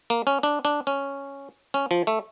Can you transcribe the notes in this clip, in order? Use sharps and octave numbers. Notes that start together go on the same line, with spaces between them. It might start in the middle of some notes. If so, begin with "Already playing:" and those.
A#3
C#4
D4
D4
C#4
C#4
F3
A3